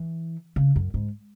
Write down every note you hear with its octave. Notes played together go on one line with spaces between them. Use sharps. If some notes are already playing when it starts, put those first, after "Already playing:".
Already playing: E3
C#3
F#2
G#2